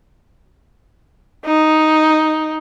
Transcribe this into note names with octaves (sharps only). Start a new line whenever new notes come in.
D#4